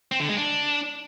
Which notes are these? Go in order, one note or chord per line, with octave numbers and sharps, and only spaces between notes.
C4
D3
G#3
D4